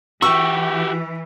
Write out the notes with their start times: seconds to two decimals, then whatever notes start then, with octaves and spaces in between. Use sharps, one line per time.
0.22 E3 F#4 G4 C#6 E6